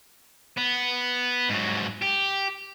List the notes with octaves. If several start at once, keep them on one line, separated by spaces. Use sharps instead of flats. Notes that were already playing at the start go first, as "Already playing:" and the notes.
B3
G#2 F#3
G4